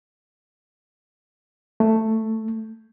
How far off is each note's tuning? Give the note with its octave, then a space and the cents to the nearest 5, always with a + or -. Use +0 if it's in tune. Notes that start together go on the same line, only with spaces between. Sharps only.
A3 +5